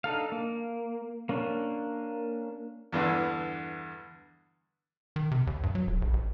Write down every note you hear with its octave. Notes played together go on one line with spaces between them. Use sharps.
D4 D#4 A4 F5
A#3
A#3 C#4 D4
E2 G2 D3 E3
D#3
C3
D#2
G2
F#3
D#1
A#1
A1